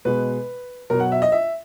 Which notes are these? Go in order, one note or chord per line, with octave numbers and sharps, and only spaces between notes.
B2 G#3 B4
B2 F#3 A#4
F#5
E5
D#5
E5